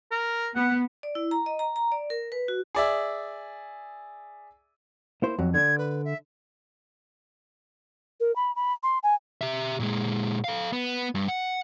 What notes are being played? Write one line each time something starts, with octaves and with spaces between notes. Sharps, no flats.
A#4
B3 F#5
D5
E4
A#5
D#5
A#5
A#5
D5
A#4
B4
F#4
G#4 D5 E5
A#3 E4 C5
F2 F#3
D3 D4 G#6
B4
E5
A#4
B5
B5
C6
G#5
G4 E5
A#2 G#3
A4 F5
B3
G2
F#5